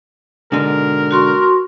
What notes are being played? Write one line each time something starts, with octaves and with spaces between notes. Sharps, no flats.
G#2 B2 D3 A#4
F#4 C6 C#6